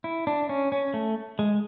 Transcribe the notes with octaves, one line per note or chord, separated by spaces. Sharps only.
E4
D4
C#4
C#4
A3
G#3